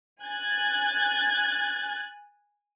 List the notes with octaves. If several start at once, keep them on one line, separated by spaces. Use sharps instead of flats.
G#5 F#6 G#6 A6